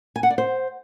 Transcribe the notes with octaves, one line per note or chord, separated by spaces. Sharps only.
G#5
F#5
D5
C5